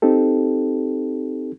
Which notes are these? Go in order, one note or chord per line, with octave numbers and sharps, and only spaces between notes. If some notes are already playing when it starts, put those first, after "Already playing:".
C4 D#4 G4 A4